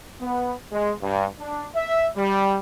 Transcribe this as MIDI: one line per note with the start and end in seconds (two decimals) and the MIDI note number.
0.20 0.53 59
0.71 0.91 56
1.02 1.24 43
1.38 1.65 62
1.74 2.07 76
2.16 2.57 55